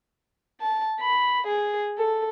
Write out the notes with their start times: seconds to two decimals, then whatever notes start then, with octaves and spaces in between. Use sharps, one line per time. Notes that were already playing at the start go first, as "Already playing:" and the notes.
0.61 A5
0.99 B5
1.46 G#4
1.97 A4